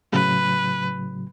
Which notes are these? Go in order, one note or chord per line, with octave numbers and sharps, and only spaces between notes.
A2 C#3 F#3 B4